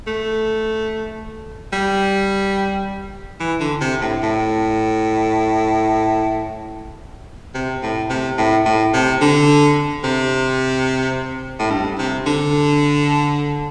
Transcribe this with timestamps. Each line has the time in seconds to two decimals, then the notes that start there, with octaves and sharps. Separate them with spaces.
0.07 A3
1.73 G3
3.40 E3
3.60 D3
3.81 C3
4.01 A2
4.23 A2
7.54 C3
7.83 A2
8.10 C3
8.38 A2
8.65 A2
8.94 C3
9.21 D3
10.04 C3
11.59 A2
11.70 G2
11.98 C3
12.26 D3